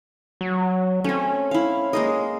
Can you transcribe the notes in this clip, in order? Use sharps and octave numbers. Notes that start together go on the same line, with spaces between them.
F#3
A3 C4 C#4
E4 F5
G#3 A#3 D#5